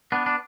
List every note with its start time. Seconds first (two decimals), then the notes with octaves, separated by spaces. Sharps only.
0.12 B3 D4
0.26 D4